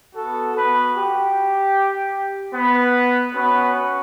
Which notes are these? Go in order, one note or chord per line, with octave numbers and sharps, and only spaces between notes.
B3 F#4 A4
B3 B4
G4
B3 B4
B3 C#4 F#4 B4